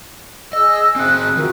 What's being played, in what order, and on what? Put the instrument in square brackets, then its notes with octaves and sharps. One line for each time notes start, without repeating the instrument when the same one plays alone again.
[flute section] G#4 E6 [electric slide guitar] D#5
[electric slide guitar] C4 G#4 [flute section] F#6
[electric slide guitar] D#3 [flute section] F4 F#4 A#4